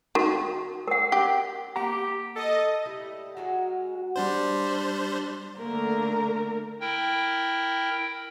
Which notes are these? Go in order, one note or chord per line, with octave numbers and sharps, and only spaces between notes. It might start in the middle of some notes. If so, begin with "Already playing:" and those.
D#3 F#4
A#4 F#5
G4
A#3 G4 F#5 A#5
A4 D#5
G3 A3 E4
F#3 G#3 F#4 A#4
G3 D4 C5
D3 A3 A#3 A#4
E4 A#4 G5